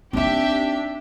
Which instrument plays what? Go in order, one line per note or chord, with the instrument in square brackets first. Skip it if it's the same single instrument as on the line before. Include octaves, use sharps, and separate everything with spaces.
[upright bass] C4 D#4 [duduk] D4 [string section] G4 E5